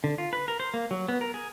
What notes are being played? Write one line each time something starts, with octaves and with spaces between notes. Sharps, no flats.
D3
F4
B4
A#4
C5
A#3
F#3
B3
A#4
G#4